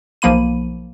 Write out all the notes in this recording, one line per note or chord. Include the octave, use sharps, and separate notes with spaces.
B1 F3 A#3 B5 D#7